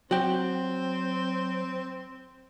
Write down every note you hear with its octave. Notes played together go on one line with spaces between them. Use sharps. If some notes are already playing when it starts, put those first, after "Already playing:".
F#3 C4 F#4 G5